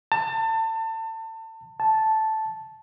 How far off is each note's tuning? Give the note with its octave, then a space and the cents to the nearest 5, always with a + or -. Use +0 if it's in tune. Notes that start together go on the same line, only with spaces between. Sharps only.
A5 +30
A5 -5